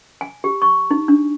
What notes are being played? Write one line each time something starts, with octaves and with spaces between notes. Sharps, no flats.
G#5
G4
C#6
D#4
D4